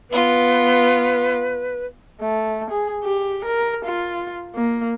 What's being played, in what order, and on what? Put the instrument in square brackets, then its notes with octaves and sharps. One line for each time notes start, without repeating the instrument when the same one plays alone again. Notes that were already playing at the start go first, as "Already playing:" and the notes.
[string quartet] B3 F4 [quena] B4
[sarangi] A3
G#4
G4
A#4
F4
A#3